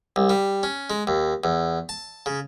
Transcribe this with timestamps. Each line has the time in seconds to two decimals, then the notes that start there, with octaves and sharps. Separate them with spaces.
0.16 C2
0.30 G3
0.63 C#4
0.90 G#3
1.07 D#2
1.44 E2
1.89 A5
2.26 C#3